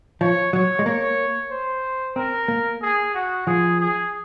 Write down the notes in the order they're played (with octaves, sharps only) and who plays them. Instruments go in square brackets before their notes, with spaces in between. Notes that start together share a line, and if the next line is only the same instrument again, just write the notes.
[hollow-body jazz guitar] F3 [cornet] C#5
[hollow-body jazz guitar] F#3 [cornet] C#5
[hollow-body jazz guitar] G#3
[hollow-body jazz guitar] A#3 [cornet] C#5
[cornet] C5
[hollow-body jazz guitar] C4 [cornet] A#4
[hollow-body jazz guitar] A#3
[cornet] G#4
F#4
[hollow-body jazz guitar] F3 [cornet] G#4
[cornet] G#4